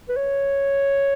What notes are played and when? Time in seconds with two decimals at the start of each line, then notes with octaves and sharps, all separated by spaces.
0.09 B4
0.17 C#5